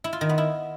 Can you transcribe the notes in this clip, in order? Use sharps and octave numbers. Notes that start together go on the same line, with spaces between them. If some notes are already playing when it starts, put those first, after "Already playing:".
E4
F4
D#3
B3
E4